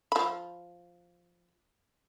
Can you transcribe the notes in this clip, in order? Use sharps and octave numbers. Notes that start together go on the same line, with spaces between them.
F3 B5